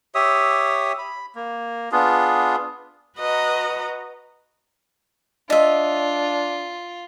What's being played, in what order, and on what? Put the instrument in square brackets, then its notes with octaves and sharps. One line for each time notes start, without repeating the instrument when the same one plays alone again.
[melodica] G4 C#5 E5 D#6
B5
A#3
B3 D4 F4 G#4
[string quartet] F#4 B4 D#5 A#5
[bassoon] D4 [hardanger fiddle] F4 [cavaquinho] D#5 E5